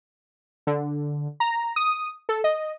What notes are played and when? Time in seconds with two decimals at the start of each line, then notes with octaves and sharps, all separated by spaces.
0.67 D3
1.40 A#5
1.76 D#6
2.29 A4
2.44 D#5